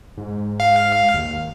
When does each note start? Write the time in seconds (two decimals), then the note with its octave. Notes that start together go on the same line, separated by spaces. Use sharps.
0.17 G#2
0.60 F5
1.14 D#2